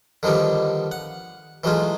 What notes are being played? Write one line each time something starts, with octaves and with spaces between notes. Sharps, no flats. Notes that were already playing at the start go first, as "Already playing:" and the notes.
D3 D#3 F3 G3 B3
F#5
E3 F#3 G#3 A3 F4